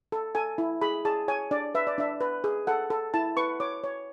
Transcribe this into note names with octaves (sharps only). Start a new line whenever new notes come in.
A4
A4 G#5
E4
G#4 B5
G#4 A5
C#5 G#5
D4 D5
B4 E5
D5
D4 E5
B4
G#4
A4 F#5
A4
E4 A5
B4 C#6
C#5 D6
C#5